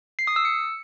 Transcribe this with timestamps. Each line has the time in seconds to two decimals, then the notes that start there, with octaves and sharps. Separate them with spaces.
0.19 C7
0.27 D#6
0.36 E6
0.45 C#7